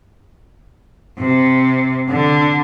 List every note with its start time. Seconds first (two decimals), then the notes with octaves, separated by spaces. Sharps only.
1.19 C3
2.09 D3